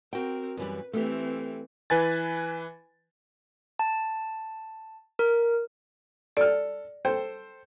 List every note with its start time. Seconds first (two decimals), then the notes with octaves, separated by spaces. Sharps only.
0.13 C4 F#4 A#4 G5
0.57 F#2 E3 G3 B4
0.93 E3 A3 C4 G4
1.90 E3 B4 G#5 A6
3.79 A5
5.19 A#4
6.37 A4 D5 F6
7.05 A4 C5 G5